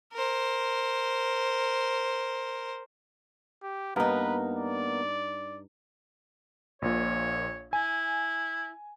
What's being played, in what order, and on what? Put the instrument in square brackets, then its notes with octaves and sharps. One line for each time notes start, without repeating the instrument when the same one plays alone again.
[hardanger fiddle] A#4 C5
[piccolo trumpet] G4
[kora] G2 D#4 [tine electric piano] A#3 B3 A#4 [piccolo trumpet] B4
[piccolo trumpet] D5
[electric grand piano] A#1 A#2 [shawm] C#5
[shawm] E4 [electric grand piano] G#5